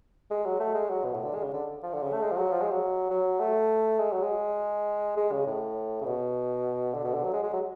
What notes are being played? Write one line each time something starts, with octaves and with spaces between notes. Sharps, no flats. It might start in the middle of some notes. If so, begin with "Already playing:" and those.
G#3
F#3
A3
G#3
F#3
B2
A2
D3
G#3
C#3
D3
F3
D3
C#3
A3
G#3
F3
F#3
F3
G#3
F#3
F#3
A3
G#3
F#3
G#3
G#3
C#3
A2
C#3
B2
D3
B2
D3
F#3
G#3
G#3
F#3